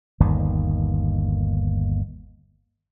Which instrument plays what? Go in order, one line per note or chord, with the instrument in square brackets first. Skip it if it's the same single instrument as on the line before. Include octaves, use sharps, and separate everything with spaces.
[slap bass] G1 D#2 D#3